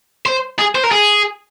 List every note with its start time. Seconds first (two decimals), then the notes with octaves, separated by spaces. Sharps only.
0.26 C5
0.59 G#4
0.75 C5
0.83 A#4
0.92 G#4